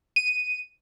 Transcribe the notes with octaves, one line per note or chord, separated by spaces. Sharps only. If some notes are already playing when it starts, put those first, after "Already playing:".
D#7